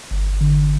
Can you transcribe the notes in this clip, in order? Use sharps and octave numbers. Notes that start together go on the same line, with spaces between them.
G1
D3